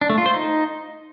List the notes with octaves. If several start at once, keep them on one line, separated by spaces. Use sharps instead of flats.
D4
A3
F4
C5
D#4